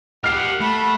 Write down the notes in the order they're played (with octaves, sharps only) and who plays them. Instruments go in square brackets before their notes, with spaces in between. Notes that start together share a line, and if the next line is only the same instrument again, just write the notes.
[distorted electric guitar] G4 A#4 [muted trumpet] F#5 [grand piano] F6 C7
[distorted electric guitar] A3 [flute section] B5